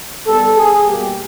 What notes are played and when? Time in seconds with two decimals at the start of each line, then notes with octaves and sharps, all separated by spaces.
0.27 D#3 G3 B3 A4
0.57 G#4
0.86 B2 G3 A#3 G4